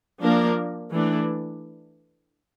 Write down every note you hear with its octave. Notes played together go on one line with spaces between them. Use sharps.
F3 A#3 D4 A#4
E3 A3 D4